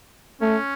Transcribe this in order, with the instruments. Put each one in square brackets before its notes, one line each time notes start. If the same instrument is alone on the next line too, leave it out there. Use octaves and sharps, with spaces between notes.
[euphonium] A3 [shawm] C#4